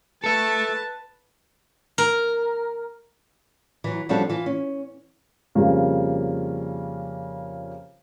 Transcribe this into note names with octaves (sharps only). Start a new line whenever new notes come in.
A4 B4 E5 A5
A#4
E3 F#3
F3 G3 C#4 D4 F#4 A4
E3 F4
C#4
F2 C#3 G3 A#3